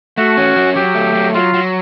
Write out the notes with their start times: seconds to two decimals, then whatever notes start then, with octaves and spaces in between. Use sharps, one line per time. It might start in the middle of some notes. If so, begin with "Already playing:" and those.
0.18 A3 F#4
0.37 C#4
0.56 F#3
0.75 F#3 G4
0.95 A3
1.15 F#3
1.34 F#3 F4
1.54 F#3